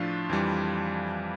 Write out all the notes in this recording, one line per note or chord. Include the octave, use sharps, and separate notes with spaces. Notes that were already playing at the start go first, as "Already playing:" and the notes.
Already playing: A2 F3 A3 D4 F4
F2 E3 G3